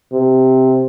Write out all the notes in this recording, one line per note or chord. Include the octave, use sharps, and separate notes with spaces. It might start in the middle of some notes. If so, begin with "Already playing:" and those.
C3